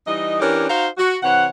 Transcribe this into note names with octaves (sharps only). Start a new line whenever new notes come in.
E3 G3 D#4 D#5
E3 C#4 D4 G4 A#4 C#5
D#4 F#4 C5 F5
F#4
C3 E3 C#5 F#5